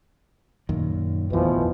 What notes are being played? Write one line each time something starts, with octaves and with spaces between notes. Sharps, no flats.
F#2 A#2 D#3
A1 F2 B2 E3 F3